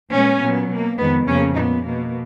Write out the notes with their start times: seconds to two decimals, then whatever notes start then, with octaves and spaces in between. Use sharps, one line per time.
0.11 A#2 G#3 B3 C#4
0.39 A#2 F#3 B3
0.68 B2 A#3
0.97 F2 D#3 G#3 B3
1.26 F2 C#3 F3 A#3 C#4
1.55 A#2 G#3 B3 D#4
1.84 B2 A#3